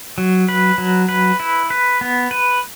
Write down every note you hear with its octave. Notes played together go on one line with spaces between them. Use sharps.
F#3
B4
F#3
B4
E4
B4
B3
B4